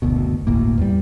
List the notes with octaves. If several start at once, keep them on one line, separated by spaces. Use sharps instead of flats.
F#1 D2 B2
G1 D2 A2 A#3
E2 G3